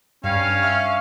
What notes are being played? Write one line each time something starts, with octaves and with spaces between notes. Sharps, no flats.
G2 G3 C#4 F5
E5 C#6 F6